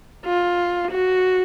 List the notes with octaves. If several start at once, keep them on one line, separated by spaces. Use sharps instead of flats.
F4
F#4